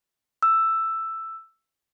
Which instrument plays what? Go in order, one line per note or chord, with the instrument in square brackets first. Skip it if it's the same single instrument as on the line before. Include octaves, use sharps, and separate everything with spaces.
[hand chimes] E6